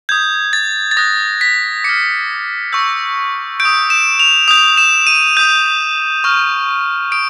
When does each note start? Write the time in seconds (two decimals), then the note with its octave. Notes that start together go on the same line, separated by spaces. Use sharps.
0.09 D#6 G6 G#6
0.53 A6
0.91 A6
0.97 D#6 F#6 A#6
1.41 B6
1.84 D6 F6 C#7
2.72 C#6 E6 G6
3.60 G6 D7
3.65 D#6
3.90 E7
4.20 F7
4.48 D#6 G6 F7
4.77 E7
5.07 D#7
5.37 D#6 G6
6.24 C#6 F6
7.12 D#6 D7